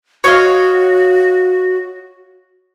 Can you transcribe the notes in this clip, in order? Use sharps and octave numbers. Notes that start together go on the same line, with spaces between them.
F#4 C#5 D#5 F5